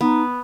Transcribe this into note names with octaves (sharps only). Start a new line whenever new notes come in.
B3 D#4